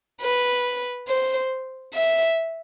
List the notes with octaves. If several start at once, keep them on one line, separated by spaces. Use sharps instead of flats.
B4
C5
E5